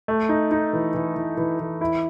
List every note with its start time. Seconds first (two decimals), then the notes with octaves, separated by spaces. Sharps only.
0.08 A3
0.29 D#4
0.51 D#4
0.73 E3
0.94 E3
1.16 E3
1.37 E3
1.59 E3
1.81 E4